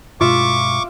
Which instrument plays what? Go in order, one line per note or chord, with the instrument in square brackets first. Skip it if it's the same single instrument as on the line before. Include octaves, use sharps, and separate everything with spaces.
[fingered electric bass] G2 B2 G#3 [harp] F4 E5 [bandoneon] C#6 D6